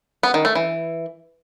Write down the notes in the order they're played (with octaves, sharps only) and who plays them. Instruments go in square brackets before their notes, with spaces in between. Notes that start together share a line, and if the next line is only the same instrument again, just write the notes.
[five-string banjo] B3
D#3
A3
E3